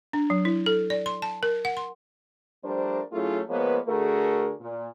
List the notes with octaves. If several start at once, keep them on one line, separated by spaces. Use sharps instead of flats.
D4
F#3
E4
A4
D5
C6
A5
A#4
F#5
C6
F3 G3 A3 D4 A#4 C5
F#3 A3 C#4 E4 F4 G#4
F3 G#3 A#3 B3 B4 C#5
D3 A3 F#4 G#4 A#4
A#2